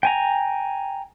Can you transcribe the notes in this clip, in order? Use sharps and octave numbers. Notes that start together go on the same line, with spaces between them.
G5 G#5 A#5